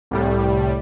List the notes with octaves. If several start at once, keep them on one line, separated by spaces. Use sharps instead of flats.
C2 A2 G3